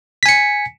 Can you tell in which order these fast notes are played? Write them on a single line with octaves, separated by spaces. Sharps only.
B6 G#5 C#7